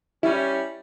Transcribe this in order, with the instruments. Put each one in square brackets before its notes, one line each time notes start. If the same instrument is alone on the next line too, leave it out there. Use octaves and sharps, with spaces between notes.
[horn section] G3 C#4 [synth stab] E4 [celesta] E5